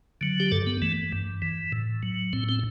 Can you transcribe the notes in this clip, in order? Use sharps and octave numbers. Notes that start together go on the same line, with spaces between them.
D3 F#3
G4
G2 A4
B3
E3 A3
G2
E3
A2
F#3
A2 C4
C4